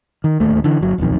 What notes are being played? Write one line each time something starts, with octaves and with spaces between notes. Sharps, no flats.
D#3
D1 D#2 A3
D3 E3
G1 F#3
D#1 B1 F2 D#3